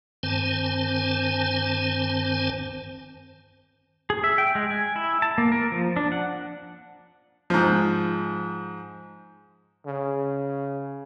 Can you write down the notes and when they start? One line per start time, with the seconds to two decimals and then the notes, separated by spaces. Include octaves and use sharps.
0.23 G2 D#3 C4 C5 G#5 A5
4.10 G#4
4.24 E5
4.38 G5
4.55 G#3
4.71 G#5
4.96 E4
5.22 A5
5.38 A#3
5.52 A#4
5.72 F3
5.96 D4
6.12 F#5
7.50 G#2 F3
9.86 C#3